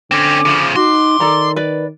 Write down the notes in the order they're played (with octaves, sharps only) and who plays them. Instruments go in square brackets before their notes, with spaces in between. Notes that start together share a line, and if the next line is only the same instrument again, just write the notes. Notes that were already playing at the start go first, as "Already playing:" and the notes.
[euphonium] D3 [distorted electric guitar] C4 C#4 [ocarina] D6
[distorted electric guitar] C#3 F3
[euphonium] D#4 [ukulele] F#4 [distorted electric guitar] C6 [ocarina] D6
[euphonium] D#3 [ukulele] A4 D5 A#5
[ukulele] B4 D5